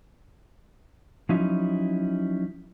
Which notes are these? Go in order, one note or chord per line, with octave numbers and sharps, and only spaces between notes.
F3 F#3 C#4 D#4 E4